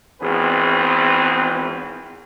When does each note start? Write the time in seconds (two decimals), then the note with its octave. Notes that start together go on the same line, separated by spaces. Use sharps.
0.21 G#1 E2 C4 G#4 B4